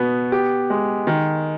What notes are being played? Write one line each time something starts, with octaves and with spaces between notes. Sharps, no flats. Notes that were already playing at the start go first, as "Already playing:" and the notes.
Already playing: B2 B3
G4
G#3
D#3